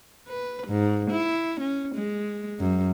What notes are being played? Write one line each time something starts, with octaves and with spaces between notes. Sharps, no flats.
B4
G#2
E4
C#4
G#3
F#2